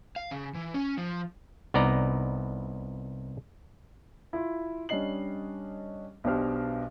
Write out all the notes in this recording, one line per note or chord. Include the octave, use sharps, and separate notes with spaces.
F5
C#3
E3
C#4
F3
C2 B3 D#4 D5 A#5
E4 F4
G3 C#4 D4 D#5 C7 F#7
B1 B2 D4 G4 C5 F6